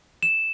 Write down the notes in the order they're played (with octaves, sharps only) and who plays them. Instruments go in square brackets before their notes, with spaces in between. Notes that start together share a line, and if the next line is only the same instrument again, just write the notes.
[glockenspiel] E7